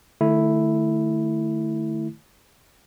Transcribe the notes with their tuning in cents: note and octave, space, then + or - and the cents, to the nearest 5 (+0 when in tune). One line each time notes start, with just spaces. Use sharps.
D#3 -40 A3 +0 E4 +0